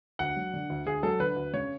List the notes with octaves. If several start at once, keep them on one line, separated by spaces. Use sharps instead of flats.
D2 F#5
F#3
D3
D2
D2 G#4
F#3 A4
D3 B4
D2
C#3 C#5